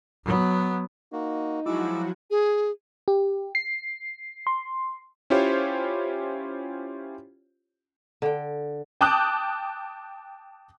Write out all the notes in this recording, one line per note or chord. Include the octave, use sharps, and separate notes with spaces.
F#3 B3
A#3 D#4 F#4
F3 F#3 G#3 E4 F#4 D6 E6
G#4
G4
C7
C6
C#4 E4 F4 G4 C5 C#5
D3 G5
G5 A5 D6 D#6 F#6 G6